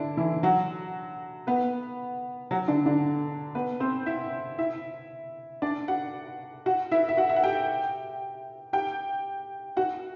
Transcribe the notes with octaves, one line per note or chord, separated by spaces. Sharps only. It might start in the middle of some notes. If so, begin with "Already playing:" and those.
Already playing: D3 D4 E4
E3 E4
F#3 F#4
B3 B4
F#3 F#4
D3 D4
D3 D4
B3 B4
C4 C5
E4 E5
E4 E5
D4 D5
F#4 F#5
F#4 F#5
E4 E5
E5
F#4 F#5
E5
F#5
G4 G5
G4 G5
F#4 F#5